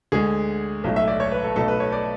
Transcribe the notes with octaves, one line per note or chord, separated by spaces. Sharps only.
D2 D3 G#3 G#4
B1 A2 F#3 A3
E5
D5
C#5
B4
A4
B1 B2 A3 A4
B4
C#5
D5